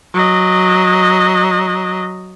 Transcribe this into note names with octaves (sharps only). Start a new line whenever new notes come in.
F#3 D#5